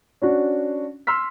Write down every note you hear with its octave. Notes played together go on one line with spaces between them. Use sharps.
C#4 D4 F#4
C6 E6 F6 B6